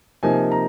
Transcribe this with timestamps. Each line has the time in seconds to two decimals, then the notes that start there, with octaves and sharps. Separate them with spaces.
0.23 C3 F3 A#3 D#4 G#5
0.52 A#5